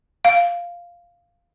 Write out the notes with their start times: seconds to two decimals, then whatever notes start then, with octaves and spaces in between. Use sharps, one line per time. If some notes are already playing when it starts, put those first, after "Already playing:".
0.25 F5